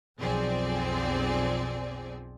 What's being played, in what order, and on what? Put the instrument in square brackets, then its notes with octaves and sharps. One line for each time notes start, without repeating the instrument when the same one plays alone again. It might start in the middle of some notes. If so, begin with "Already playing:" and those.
[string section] B1 F2 F3 C4 G#4 D5